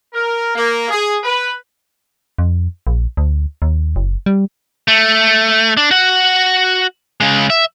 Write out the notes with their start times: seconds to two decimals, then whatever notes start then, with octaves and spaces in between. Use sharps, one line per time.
0.13 A#4
0.55 A#3
0.89 G#4
1.23 B4
2.38 F2
2.87 A#1
3.17 D2
3.62 D#2
3.96 F#1
4.26 G3
4.88 A3
5.77 D4
5.91 F#4 F#5
7.21 C#3 G#3
7.50 E5